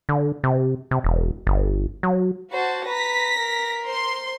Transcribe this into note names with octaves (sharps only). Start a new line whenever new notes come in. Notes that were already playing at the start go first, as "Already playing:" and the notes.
D3
C3
C3
E1
G1
F#3
F#4 C5 A5
B4 A#5 A#6 B6
A#4
C5 C6